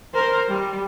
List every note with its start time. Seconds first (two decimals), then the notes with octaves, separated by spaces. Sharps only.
0.14 A#4 C5
0.48 G3